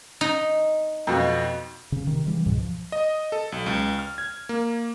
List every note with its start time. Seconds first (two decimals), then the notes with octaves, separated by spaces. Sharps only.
0.21 D#4
1.07 F2 B2
1.92 C#3
2.07 C3 D#3
2.27 C#3 E3 G3
2.46 C#2 G#2 B2
2.58 F3
2.92 D#5
3.32 A4
3.52 B1
3.66 C#2
3.99 F6
4.18 G#6
4.49 A#3